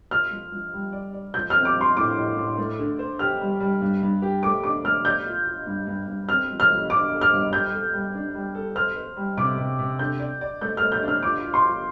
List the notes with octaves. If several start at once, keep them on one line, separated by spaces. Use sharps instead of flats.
F4 F6
F3
F3
G3
D5
D5
F3 G6
C4 F6
D6
F3
C6
A2 D6
A2
A2
A3
D3
C5
G4 F6
G3
G3
G2
G2
G4
A3 D6
D4 D6
A3 F6
D5 G6
F4
F4
G2
G2
G2
C4 F6
F3
F6
F3
D4 D6
A4
F6
G2
G3 G6
A4
G3
D4
G3
A4
C5 F6
C5
G3
C3 D6
C3
C3
D3 G6
D5
D5
A3 G6
A3 F6
G6
D4
F6
F4 D6
F4
C6
F4